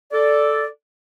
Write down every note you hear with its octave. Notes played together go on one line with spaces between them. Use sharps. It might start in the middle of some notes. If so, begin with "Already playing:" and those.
A4 D5